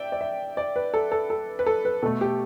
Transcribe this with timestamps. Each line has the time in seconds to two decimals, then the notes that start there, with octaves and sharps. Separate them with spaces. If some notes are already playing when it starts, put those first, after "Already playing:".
Already playing: D5 E5 G5
0.12 D5
0.21 E5
0.57 D5
0.76 B4
0.94 A4
1.12 A4
1.30 A4
1.59 B4
1.66 A4
1.85 B4
2.02 B2 A3 A4
2.21 G4